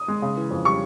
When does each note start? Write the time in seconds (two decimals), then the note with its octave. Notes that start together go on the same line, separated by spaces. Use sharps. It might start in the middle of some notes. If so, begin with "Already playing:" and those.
Already playing: D#6
0.08 G#3
0.22 C#3
0.37 E3
0.51 F2
0.65 G3 C#6